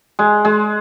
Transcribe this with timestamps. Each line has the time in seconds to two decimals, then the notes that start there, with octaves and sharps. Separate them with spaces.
0.19 G#3
0.45 G#3